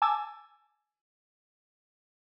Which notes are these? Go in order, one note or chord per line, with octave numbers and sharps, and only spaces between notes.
G#5 A5 D6 E6 G#6 A6